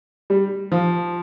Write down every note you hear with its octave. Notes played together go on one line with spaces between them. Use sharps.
G3
F3